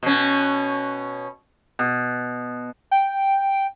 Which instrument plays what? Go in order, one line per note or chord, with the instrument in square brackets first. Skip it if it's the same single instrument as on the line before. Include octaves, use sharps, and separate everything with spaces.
[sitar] B2 C#4
[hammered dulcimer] B2
[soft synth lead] G5